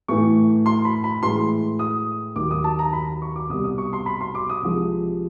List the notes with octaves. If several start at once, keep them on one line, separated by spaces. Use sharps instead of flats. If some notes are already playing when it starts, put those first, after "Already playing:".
A2 E3 A3 C#6
C6
B5
B5
A2 E3 G#3 C6
D#6
D#2 D#3 F#3 D6
D#6
A5
A#5
B5
C#6
D6
C2 B2 G3 D#6
D#6
C#6
C6
B5
C6
D6
D#6
C2 C3 F3 G#3